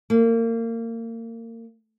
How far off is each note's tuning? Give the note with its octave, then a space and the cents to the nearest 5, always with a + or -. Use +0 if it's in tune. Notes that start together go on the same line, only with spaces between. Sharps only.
A#3 -30